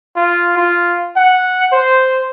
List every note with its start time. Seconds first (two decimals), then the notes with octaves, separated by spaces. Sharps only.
0.16 F4
0.57 F4
1.17 F#5
1.73 C5